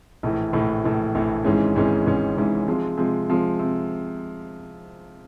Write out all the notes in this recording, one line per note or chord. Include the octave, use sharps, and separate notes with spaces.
A#1 A2 E3
A#1 A2 E3
A#1 A2 E3
A#1 A2 E3
G#1 G#2 E3 G#3 C#4
G#1 G#2 E3 G#3 C#4
G#1 G#2 E3 G#3 C#4
G#1 G#2 E3 G#3 C#4
C3 F3 G#3
C3 F3 G#3
C3 F3 G#3
C3